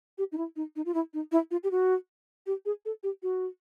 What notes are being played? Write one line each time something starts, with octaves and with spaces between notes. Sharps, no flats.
G4
D#4
E4
D#4
D#4
F4
E4
D#4
E4
F4
G4
F#4
G4
G#4
A4
G4
F#4